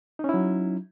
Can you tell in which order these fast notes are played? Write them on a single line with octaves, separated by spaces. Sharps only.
D#4 C#4 E4 F#3